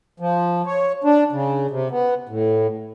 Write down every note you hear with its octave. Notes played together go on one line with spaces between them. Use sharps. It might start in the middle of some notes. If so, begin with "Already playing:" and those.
F3
C#5
D4
C#3
C3
B3
A2